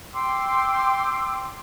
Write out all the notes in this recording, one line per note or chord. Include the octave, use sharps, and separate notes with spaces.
G5 C6 D6 E6